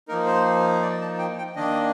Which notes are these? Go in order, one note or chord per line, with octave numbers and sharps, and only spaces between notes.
F3 A#3 D#4 A#4
C5
D5
A5
G5
G5
D#3 A#3 D4 D#5